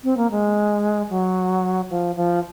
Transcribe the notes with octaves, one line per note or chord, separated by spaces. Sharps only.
C4
A#3
G#3
F#3
F3
F3